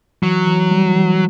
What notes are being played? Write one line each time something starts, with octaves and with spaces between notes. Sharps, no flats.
E3 F#3
E3
G3
E3